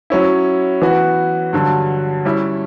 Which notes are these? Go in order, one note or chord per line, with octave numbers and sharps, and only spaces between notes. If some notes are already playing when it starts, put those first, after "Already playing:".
F#3 C#4 E4
E3 B3 F#4
G2 D3 F#3
G3 C#4 E4